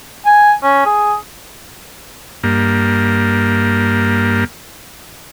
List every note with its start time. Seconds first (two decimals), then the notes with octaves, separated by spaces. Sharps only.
0.25 G#5
0.63 C#4
0.86 G#4
2.43 G2 A#3